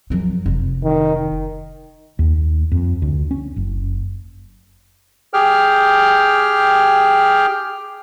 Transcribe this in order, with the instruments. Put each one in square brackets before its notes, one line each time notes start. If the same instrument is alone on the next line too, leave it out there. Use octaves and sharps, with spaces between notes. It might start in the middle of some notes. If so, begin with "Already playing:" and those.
[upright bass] F#2 F3
F1
[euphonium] D#3
[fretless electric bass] D#2
F2
D2
C#4
F#1
[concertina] G4 G#4 G5 F6